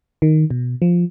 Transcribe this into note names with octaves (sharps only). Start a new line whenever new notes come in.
D#3
B2
F3